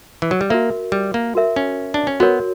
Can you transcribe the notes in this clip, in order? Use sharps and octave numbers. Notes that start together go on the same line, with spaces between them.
E3
F#3
G3
A#3 F#4 A#4 E5
G3
A#3
F#4 A#4 E5
C#4
D4
C#4
B3 F#4 A#4 C#5